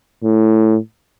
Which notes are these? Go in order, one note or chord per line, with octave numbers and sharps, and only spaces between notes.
A2